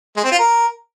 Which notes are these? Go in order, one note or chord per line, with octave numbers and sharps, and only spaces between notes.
G#3
C4
F4
A#4